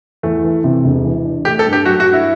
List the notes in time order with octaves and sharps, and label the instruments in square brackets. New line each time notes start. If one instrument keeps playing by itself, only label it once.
[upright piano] E2 [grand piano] A3
[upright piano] E3
C3
E1
E3
D4
[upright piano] A3 [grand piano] G4
[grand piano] A4
[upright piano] G2
[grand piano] G4
[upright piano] F#3 [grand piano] F#4
[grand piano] F#4
[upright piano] G2
[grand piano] E4